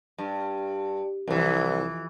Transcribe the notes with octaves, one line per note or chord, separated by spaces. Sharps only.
G2
C2 F2 E3